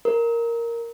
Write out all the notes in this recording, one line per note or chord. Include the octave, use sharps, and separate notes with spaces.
A#4